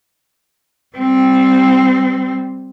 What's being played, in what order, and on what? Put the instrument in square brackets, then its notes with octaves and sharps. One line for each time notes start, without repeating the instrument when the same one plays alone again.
[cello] G3 C4